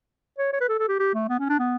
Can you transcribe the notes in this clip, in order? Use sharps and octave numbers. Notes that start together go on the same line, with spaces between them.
C#5
C#5
B4
A4
A4
G4
G4
A3
B3
C#4
D4
B3